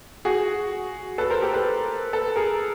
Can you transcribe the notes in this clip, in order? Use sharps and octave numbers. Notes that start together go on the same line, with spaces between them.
F#4 G#4
A4 B4
A#4 C5
G4 A4
A4 B4
A4 B4
G#4 A#4